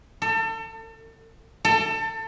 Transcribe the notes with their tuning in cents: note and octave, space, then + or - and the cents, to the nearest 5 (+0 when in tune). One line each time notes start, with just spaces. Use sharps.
A4 +35
A4 +25